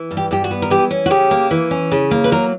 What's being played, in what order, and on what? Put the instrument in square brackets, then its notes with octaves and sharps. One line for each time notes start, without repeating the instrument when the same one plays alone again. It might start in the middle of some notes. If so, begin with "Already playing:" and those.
Already playing: [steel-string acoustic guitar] E3
G2
G4
G2 G4
F#4
B3
A#4
E3 G4
C#4
F#4
C#3 G4
A#3
E3
C#4
C#3
A#3
B4
F#3 A#4